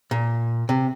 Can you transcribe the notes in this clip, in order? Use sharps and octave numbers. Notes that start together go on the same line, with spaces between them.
A#2
C3